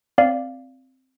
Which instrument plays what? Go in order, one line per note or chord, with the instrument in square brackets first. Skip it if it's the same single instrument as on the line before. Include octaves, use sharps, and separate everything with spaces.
[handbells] C4 D5 F5